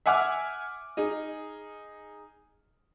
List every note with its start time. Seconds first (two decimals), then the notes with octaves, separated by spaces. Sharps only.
0.06 E5 F#5 G#5 D6 F6
0.97 D#4 G#4